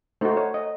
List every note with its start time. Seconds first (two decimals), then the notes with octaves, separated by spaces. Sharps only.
0.21 A3 D#4 F#4 C5
0.37 C#5
0.54 D#5